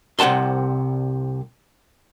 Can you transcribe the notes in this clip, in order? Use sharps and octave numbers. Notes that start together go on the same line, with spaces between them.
C2 C3 F#5 A5 C6